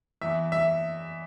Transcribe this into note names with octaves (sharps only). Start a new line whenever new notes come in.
E2 E5
E5